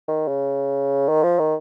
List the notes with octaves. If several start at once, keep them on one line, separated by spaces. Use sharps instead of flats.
D#3
C#3
D#3
F3
D#3